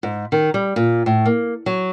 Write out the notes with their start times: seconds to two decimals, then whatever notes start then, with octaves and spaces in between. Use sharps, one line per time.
0.03 G#2
0.32 D#3
0.54 G3
0.76 A#2
1.06 A2
1.25 A#3
1.66 F#3